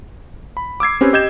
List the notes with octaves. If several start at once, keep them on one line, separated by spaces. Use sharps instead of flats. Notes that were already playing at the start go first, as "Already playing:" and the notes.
B5
D6 E6 G#6 C7
C4 C#4 G4 B4
G4 D#5 G6 G#6 E7